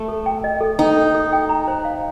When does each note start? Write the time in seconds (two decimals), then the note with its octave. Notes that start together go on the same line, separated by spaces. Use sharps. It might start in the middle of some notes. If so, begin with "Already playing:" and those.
Already playing: A3
0.08 A4
0.26 G5
0.44 D#5
0.61 A4
0.79 D#4 G5
0.97 A4
1.15 A4
1.33 G5
1.49 A#5
1.68 C5
1.85 F5